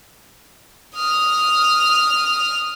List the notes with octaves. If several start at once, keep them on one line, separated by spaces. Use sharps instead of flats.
D#6 F6